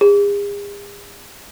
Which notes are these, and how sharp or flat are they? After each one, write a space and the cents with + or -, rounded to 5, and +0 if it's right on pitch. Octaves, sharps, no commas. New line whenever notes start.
G#4 -40